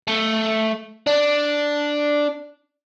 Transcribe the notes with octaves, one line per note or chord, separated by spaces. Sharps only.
A3
D4